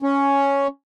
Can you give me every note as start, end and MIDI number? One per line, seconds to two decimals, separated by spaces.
0.02 0.67 61